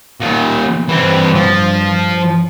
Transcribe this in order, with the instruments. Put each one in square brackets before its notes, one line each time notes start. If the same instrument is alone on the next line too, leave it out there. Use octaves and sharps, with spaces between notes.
[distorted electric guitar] A#2 D#3
[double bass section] G2 [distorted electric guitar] E3 C4
[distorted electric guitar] F3